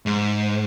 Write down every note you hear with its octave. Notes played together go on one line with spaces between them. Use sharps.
G#2